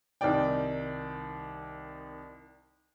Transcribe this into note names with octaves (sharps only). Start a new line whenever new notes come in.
C2 D#3 D#4 D5 G5